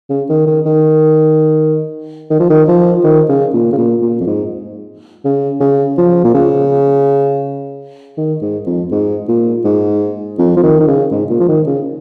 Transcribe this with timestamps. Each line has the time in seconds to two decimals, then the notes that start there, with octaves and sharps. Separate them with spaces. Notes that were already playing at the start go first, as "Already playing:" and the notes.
0.10 C#3
0.29 D#3
0.47 D#3
0.66 D#3
2.30 D#3
2.40 F3
2.50 D#3
2.68 F3
3.04 D#3
3.29 C#3
3.54 A#2
3.73 C#3
3.78 A#2
4.02 A#2
4.20 F2
4.27 G#2
5.25 C#3
5.60 C#3
5.98 F3
6.24 A#2
6.34 C#3
8.18 D#3
8.42 G#2
8.66 F2
8.91 G#2
9.28 A#2
9.65 G#2
10.38 F2
10.57 F3
10.63 D#3
10.80 D#3
10.88 C#3
11.11 G#2
11.30 A#2
11.40 F3
11.48 D#3
11.67 C#3